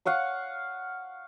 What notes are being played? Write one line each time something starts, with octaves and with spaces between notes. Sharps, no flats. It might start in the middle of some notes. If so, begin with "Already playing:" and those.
F5 F#5 C#6 D#6